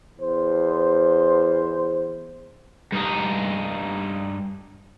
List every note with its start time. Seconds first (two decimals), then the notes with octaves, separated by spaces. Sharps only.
0.19 E2 C5
2.92 G2 D#4